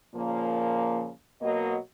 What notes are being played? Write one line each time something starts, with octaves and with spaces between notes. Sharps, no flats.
A#2 C#3 F3 A#3
B2 F#3 A#3 D#5